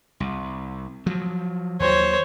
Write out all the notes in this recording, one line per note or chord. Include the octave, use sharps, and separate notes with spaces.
C2
F3 F#3
D#2 F#3 C5 C#5